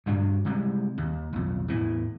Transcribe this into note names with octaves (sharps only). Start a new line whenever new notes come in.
D2 G2 D4
C3 G3 G#3
D#2
B1 F2
E2 A2 E3